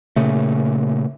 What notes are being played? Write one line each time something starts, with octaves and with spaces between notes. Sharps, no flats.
A#2 C#3 A3